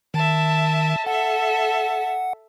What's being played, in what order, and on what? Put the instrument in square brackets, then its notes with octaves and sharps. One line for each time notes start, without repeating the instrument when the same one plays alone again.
[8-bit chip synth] D#3 [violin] E5 A5
[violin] A4 E5 [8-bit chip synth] F#5